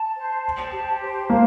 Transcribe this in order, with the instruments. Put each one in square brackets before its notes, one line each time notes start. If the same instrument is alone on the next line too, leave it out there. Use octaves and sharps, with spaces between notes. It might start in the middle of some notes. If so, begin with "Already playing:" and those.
Already playing: [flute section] A5
C5
A5
G4
C5
[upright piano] A#3 [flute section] F5